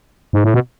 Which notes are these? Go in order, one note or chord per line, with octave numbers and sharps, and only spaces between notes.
G#2
A2
B2